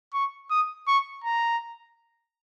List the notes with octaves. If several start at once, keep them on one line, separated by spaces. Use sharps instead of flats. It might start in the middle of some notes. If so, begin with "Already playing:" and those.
C#6
D#6
C#6
A#5